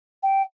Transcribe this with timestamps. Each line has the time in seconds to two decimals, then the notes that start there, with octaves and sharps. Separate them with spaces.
0.23 G5